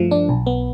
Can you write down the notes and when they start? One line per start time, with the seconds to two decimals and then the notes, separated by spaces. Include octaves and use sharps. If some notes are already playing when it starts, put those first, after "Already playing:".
Already playing: G2 F3 A3
0.11 D4
0.29 B1
0.46 B3